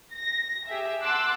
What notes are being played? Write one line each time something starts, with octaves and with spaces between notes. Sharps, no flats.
A#6
G4 G#4 E5
F#5 A5 C6 D6 E6 F#6